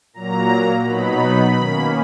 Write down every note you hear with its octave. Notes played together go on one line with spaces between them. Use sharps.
A#2 F#3 A#3 A#5
B2 F#3 B3 D#4 B5
D#3 A#3 C#4